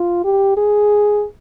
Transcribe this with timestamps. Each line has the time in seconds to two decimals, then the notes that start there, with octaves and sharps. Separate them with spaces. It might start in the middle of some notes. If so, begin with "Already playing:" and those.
Already playing: F4
0.24 G4
0.57 G#4